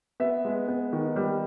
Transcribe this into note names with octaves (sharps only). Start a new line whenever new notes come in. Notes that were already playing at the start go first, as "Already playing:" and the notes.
B3 E5
G#3
B3
D#3
G3